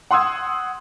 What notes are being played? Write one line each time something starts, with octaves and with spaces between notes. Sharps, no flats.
F#5 C6 D#6 E6 G#6